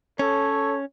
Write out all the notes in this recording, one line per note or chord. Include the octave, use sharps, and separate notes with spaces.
C#4 A4 C#5